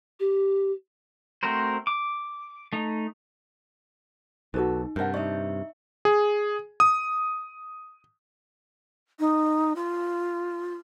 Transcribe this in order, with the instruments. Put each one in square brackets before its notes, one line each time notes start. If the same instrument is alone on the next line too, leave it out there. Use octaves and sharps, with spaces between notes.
[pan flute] G4
[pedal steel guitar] A3 C4 F#4 A#4 C5
D6
A3 D#4
[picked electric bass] B1 [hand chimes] D#4 [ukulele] F#4 A4 B4
[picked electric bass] G2 C3 [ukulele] A#4 F#5 [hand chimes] A5 G6
[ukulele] D#4 D5 [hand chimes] E5 C#6
[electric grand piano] G#4
D#6
[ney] D#4
F4